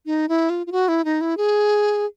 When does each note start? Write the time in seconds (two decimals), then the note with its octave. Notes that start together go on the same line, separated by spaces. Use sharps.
0.06 D#4
0.29 E4
0.50 F4
0.67 F4
0.72 F#4
0.88 E4
1.05 D#4
1.21 E4
1.37 G#4